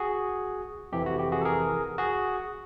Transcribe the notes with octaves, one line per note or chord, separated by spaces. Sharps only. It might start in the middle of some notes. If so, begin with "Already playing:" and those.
Already playing: F#4 G#4
F2 C3 E3 G4
F#4
G4
F#4 G#4
A4
G#4 A#4
F#4 G#4